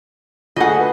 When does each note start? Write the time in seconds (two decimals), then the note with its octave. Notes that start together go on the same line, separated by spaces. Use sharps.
0.56 D2 A3 G#4 D#5 F#5
0.79 B4